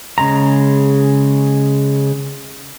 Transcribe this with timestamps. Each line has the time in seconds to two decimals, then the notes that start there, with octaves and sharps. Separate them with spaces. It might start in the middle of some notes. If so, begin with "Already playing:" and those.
0.18 C#3 G#3 A#5